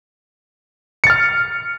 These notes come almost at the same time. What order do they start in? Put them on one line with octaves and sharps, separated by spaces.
C#7 A6 F6